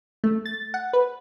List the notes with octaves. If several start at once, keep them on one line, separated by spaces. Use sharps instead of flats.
A3
A6
F#5
B4